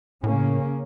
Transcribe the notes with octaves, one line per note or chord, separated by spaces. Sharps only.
A2 C#3 A#3 C#4